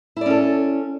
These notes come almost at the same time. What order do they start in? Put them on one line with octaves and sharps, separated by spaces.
E4 D5 C#4 A4